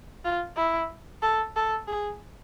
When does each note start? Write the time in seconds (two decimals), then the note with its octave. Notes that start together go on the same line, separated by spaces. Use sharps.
0.25 F4
0.57 E4
1.22 A4
1.56 A4
1.88 G#4